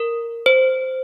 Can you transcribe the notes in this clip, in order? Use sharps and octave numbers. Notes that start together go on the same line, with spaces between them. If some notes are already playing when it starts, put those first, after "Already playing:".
Already playing: A#4
C5